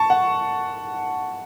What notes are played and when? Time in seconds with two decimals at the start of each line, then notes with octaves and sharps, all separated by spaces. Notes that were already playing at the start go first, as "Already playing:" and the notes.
Already playing: A5 C#6
0.10 F#5